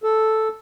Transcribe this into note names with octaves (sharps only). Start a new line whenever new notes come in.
A4